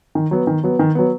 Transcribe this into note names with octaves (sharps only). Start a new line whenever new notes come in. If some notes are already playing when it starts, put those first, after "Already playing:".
D#3
F#3 B3
D#3
F#3 B3
D#3
F#3 B3